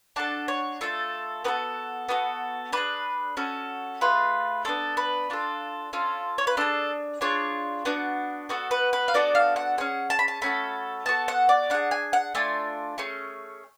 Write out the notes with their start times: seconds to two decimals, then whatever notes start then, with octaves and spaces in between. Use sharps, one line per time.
0.16 D4 F#4 A4 A5
0.48 C#5
0.81 A3 F4 A4
1.44 B3 F#4 A4 B4
2.09 B3 F#4 A4
2.72 D4 G#4 B4
3.37 C#4 F#4 A4
4.01 A3 F4 G#4 B4
4.65 B3 D4 F4 A4
4.97 B4
5.30 D4 F4 A4
5.93 C#4 F4 A4
6.38 C#5
6.47 B4
6.57 D4 G#4 A4
7.21 D4 F4 G#4 C#5
7.85 B3 D4 F#4
8.49 B3 F#4 A4
8.71 B4
8.93 B4
9.08 F5
9.14 B3 D4 F#4 A4 D5
9.35 F5
9.56 F#5
9.78 C#4 G#4 F#5
10.10 A5
10.19 B5
10.28 A5
10.42 A3 C#4 F#4 A4 B5
11.06 B3 F#4 A4 A5
11.28 F#5
11.49 D5
11.70 D4 G#4 F#5
11.91 G#5
12.13 F#5
12.35 A3 D4 F4 G#5
12.98 A3 C#4 G#4